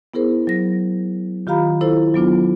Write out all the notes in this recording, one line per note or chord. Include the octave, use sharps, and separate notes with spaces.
B3 E4 G#4 A#4 C5
F#3 A#6
D#3 F4 G4 F5 A#5 B5
E4 A4 C5
F#3 B3 D4 F4